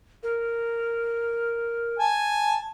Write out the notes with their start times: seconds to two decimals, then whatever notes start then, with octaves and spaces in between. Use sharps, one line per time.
0.23 A#4
1.99 G#5 A5